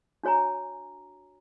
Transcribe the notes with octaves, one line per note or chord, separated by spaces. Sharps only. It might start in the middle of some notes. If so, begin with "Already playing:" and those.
D4 F#4 C#5 G#5 A#5